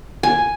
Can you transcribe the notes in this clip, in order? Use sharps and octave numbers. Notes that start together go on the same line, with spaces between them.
G#5